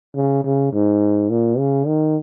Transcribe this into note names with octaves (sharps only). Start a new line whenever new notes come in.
C#3
C#3
G#2
A#2
C#3
D#3